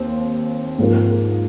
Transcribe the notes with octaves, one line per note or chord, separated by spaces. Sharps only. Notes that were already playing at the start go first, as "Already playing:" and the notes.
Already playing: D#2 C4
G#2 F3 A#3